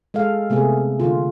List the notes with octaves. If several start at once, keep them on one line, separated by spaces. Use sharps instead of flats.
G#3 A4 F5
C3 A3 B3 G#4
D3 F4